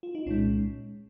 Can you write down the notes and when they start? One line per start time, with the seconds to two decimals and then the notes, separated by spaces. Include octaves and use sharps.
0.03 F4
0.15 D#4
0.26 C2 A#2 G#3 C#4